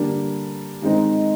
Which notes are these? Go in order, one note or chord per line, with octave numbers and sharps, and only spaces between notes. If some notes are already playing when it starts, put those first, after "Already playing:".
Already playing: D3 G3 A#3 D4
D#3 G#3 C4 D#4